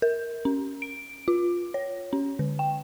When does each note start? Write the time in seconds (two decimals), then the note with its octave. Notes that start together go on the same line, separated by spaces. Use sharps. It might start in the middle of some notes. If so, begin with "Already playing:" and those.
0.02 A#4
0.45 C#4
0.82 D7
1.28 F4
1.74 C#5
2.13 C#4
2.39 D3
2.59 G5